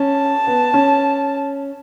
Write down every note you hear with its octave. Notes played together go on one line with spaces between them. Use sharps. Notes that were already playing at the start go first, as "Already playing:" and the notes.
Already playing: C#4 A5
B3
C#4